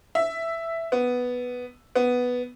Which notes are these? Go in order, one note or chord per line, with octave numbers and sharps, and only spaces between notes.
E5
B3
B3